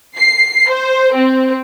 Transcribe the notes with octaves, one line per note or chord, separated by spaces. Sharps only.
C7
C5
C4